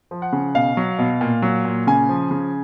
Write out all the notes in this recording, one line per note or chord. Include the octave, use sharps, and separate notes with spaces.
F3
F#5
C#3
B2 F5
F#3
B2
A#2
F#3
A#2
C#3 G#5
F3
C#3